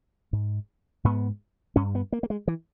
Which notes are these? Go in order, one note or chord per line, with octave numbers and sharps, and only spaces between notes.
G#2
G#2 B3
G2 C#4
B3
A#3
A#3
G#3
E3